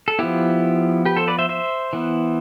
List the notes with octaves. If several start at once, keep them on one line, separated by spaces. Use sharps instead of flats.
A4
F3 B3 E4 G4
G4 B4
A4 C5
B4 D5
C5 E5
C5 E5
E3 B3